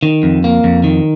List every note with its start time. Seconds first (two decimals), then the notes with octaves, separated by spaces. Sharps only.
0.03 D#3
0.23 F2
0.44 A#3
0.64 F2
0.84 D#3